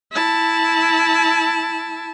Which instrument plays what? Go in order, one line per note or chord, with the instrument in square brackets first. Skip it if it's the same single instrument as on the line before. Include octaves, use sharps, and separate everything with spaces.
[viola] E4 A5